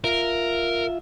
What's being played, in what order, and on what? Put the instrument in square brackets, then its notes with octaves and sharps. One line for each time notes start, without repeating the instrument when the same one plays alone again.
[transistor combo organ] F4 E5 [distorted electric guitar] A#4